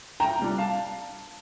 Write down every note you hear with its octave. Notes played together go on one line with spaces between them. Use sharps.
D2 G5 A#5
C3 G3 D4
F5 A5